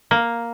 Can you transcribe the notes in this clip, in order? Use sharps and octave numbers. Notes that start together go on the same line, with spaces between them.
A#3